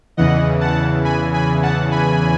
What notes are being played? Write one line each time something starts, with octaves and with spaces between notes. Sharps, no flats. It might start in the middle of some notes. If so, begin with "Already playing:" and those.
E2 C#3 E3 D#5 F#5
F#5 A5
G#5 B5
G#5 B5
F#5 A5
G#5 B5